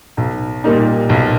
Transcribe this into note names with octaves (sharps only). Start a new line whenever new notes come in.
B1
A#2 G3 A#3 D#4
B1